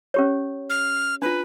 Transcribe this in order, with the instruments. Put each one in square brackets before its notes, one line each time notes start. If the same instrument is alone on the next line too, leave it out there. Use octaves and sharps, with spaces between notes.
[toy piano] C#4 G4 C#5
[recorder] F6
[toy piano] D4 F4 [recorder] B4